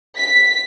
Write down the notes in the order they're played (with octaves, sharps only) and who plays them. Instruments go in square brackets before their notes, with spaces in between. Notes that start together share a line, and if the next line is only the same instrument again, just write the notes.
[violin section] B6